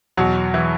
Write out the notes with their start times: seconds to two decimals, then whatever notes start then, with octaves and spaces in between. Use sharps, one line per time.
0.17 E2 B2 F#3 F#4
0.54 E3 E4